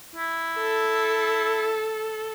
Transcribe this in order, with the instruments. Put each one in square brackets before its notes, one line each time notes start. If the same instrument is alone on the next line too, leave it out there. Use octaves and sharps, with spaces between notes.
[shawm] E4
[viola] A4